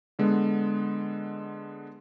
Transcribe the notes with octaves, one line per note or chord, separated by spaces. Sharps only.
D3 G#3 B3